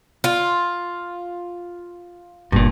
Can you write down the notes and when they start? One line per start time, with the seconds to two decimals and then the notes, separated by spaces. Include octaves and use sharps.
0.24 F4
2.52 G1 G2 A#2